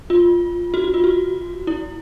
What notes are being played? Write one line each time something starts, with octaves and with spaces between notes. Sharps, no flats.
F4
F#4
F#4
F4
F#4
E4